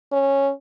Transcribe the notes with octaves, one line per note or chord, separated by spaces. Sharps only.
C#4